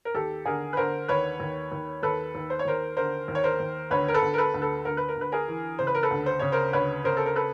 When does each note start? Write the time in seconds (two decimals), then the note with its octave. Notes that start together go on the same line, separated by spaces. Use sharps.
0.05 A#4
0.15 D#2 G4 A4
0.45 D3 G#4 A#4
0.73 B4
0.77 D3 A#4 C5
1.08 D#2 B4 C#5
1.40 D#2
1.72 D#2
2.03 D#2 A4 B4
2.35 D#2
2.50 C5
2.59 C#5
2.65 D#2 A#4 C5
2.97 D3 A#4 C5
3.28 D#2
3.35 C#5
3.44 A#4 C5
3.60 D#2
3.91 D2 B4 C#5
4.08 A#4
4.14 A4 B4
4.23 D2
4.34 A#4
4.38 A4 B4
4.54 D2
4.62 A4 B4
4.85 D2 A#4
4.97 B4
5.09 A#4
5.16 D2 B4
5.32 G#4 A#4
5.48 E3
5.79 C#3 C5
5.87 B4
5.95 A#4
6.03 A4 B4
6.11 D2
6.26 C5
6.40 C#3 C#5
6.52 A#4 C5
6.73 D2 B4 C#5
7.04 C#3 A#4 C5
7.17 A4
7.26 A#4
7.36 A4 B4